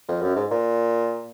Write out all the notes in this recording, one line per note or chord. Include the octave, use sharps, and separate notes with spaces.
F2
F#2
G#2
A#2